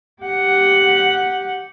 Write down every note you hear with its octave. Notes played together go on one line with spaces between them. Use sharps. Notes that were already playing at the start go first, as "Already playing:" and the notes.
G4 F#5